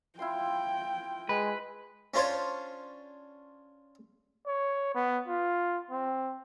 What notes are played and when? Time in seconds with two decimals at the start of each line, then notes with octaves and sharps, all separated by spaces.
0.19 E4 F4 G5 C6
1.29 G#3 B4
2.14 C#4 D4 F4 C5 C#5
4.47 C#5
4.95 B3
5.28 F4
5.90 C4